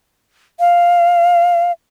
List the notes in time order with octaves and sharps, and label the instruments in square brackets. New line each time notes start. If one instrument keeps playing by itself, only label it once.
[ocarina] F5